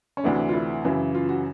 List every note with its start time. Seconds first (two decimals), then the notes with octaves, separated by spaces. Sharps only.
0.17 C#4
0.23 D2 C3 E3 A3 D4
0.49 F4
0.53 E4
0.84 F#2 C#3 E3
1.15 F4
1.29 F#4